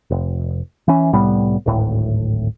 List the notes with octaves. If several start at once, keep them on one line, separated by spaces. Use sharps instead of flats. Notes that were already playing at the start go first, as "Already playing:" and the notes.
F1
E3 C#4
C2 A2 G3 B3
D1 G#1 A2